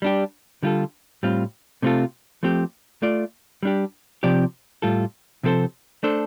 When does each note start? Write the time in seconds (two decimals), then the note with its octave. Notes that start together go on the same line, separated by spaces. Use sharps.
0.02 G3 D4 G4
0.63 D3 G3 F4 A4
1.23 A2 G3 C4 F4
1.82 C3 A3 C4 F4 A4
2.43 F3 A3 C4 G4
3.02 A3 F4 D5
3.63 G3 D4 G4
4.23 C3 F3 C4 G4 D5
4.82 A2 G3 F4 A4
5.43 C3 F3 C4 A4 C5
6.03 A3 D4 A4 C5